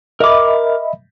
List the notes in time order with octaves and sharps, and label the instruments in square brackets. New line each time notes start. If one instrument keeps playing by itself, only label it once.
[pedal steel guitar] A#4 D6 [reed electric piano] D#5 E5 B5